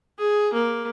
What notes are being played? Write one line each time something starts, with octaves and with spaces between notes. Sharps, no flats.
G#4
A#3